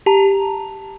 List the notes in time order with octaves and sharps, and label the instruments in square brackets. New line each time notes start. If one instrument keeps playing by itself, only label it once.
[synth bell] G4 A5 A#5